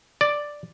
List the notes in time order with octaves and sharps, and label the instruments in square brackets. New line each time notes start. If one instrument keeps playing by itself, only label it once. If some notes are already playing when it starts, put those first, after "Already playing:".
[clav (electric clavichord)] D5